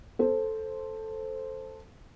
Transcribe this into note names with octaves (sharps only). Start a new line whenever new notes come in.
A4 C5